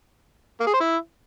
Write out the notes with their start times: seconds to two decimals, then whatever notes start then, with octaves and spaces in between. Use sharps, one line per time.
0.60 A#3
0.67 G#4
0.73 C5
0.80 E4